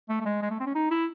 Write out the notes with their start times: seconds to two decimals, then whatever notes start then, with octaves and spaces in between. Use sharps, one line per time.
0.09 A3
0.21 A3
0.25 G#3
0.42 G#3
0.51 A3
0.60 C4
0.66 C#4
0.75 D#4
0.91 E4